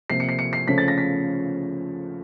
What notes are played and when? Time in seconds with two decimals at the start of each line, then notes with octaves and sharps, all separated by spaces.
0.10 C3 F3 A#3 C7
0.20 C#7
0.29 C7
0.39 C#7
0.53 C7
0.68 C#3 F3 A3 C#4 B6
0.78 A6
0.88 A#6
0.98 B6